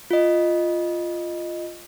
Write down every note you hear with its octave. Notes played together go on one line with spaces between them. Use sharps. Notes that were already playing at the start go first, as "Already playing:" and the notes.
F4 D#5